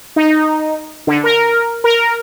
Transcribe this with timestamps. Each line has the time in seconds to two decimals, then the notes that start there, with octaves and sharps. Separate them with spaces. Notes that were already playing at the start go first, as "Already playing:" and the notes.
0.16 D#4
1.07 D3
1.24 A#4
1.84 A#4